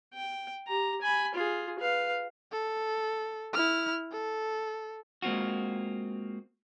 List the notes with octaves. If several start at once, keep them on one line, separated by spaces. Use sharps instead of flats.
G5
G4 A#5
G#5 B5
F4 G#4
B4 F5
A4
E4 F6
A4
G#3 A#3 C4 F4 F#4